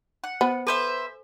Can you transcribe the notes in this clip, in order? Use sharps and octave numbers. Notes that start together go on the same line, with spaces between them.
F#5
B3 C5
A4 B4 C5 E5 G#5